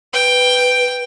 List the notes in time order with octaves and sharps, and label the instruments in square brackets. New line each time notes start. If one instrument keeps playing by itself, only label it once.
[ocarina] B4 [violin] G5